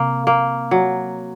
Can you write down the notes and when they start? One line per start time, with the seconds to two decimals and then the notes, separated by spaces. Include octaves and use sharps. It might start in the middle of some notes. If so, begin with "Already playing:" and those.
Already playing: C3 A#3
0.27 A#3
0.71 F#3